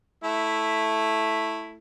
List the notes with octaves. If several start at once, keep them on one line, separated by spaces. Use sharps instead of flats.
A3 E4